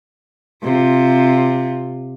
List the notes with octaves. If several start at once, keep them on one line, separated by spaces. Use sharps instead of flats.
C3 F4